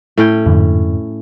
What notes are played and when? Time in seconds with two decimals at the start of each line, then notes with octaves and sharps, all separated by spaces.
0.17 A2 C#4 G5
0.46 F2 G#2 D3